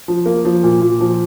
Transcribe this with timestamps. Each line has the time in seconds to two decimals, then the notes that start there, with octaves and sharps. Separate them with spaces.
0.08 F3
0.26 A#3
0.45 F3
0.63 A#2
0.81 A#2
1.01 F3